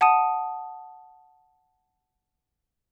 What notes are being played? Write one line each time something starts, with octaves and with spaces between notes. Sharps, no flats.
F#5 A5 D#6 D#7